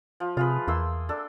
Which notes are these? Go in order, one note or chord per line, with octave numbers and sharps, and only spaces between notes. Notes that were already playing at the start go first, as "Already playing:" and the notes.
F3
C3 F4 G#4 B4
E2 A#3 C6 E6
D4 A4